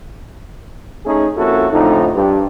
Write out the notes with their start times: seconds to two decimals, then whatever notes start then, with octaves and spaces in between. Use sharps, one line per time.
1.05 A3 C#4 D#4 G#4
1.37 F2 A#3 C#4 E4 F#4 A4
1.71 F2 A2 D3 D#4
2.14 G2